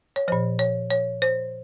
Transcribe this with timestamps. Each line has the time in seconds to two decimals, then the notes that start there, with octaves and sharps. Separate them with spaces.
0.16 C#5
0.28 A#2 F3 C5
0.59 C#5
0.91 C#5
1.22 C5